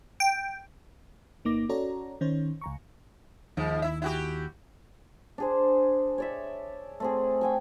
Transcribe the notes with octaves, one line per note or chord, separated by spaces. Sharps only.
G5
G1 A#3 D#4 D6 A#6
C#4 F#4 A4 C#5 D5 A#5
D#3 C#4 D#4 C5 C#5
C#2 A#5 C#6
D#2 G#2 F3
E4 E5
E4 F#4 G4
D4 G#4 C5
C#5 D5 E5
A3 C4 G#4
G5 G#5 C#6